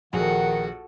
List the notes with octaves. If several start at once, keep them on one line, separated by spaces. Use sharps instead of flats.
A#1 D#3 F#4 G#4 A4 F#5